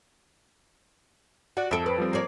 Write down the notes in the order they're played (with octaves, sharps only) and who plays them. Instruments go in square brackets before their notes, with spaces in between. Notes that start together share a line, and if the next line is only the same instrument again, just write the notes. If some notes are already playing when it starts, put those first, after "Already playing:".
[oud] F#4 [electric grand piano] D5 F#5
[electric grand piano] F2 D7 [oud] A4 E5
[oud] B4
[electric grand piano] F3 G3 C4
[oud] A#3 C#5 D5